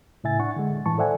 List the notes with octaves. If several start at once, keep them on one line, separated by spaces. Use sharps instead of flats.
A2 C#3 E4 E5 G#5 A6
D4 F#5 C#6
D3 G#3
A2 E3 A5 C#6
A4 C5 D5 E5 F#5 G#5